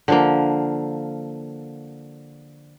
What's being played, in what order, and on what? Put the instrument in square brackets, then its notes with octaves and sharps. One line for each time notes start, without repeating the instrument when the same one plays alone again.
[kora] D3 F3 A#3